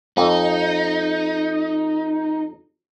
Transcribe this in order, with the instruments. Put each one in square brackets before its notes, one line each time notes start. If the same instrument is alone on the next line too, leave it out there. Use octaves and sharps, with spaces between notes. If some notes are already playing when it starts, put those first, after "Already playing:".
[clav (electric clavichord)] F2 [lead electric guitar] D#4